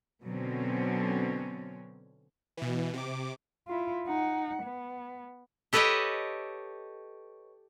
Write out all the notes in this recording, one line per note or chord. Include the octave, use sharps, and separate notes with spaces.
B2 D3 F#3 C4 C#4
B2 E3
C3 D6
E4 F4
D#4 F#5
B3
G4 A4 B4 C#5 D#5 G5